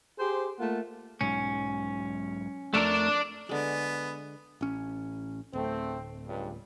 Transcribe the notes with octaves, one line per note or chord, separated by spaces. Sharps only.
G4 G#4 C5
A3 A#3 F4 F#5
B1 G#2 F#3 C#4
F2 A3 D4 A4 A#4 D5
D3 G#3 B3
A1 C#4
D1 E2 A3 C4
C#2 G2